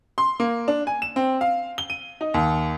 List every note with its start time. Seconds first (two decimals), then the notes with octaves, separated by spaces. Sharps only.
0.18 C6
0.40 A#3
0.68 D4
0.87 G#5
1.02 E7
1.16 C4
1.41 F5
1.78 G7
1.90 D#7
2.21 D#4
2.34 D#2